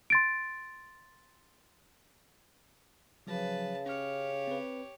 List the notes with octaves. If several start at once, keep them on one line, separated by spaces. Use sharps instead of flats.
C6 A6 D7
C#3 F3 F#3 B4 A5
C#4 G4 C#5 F6
C4 B4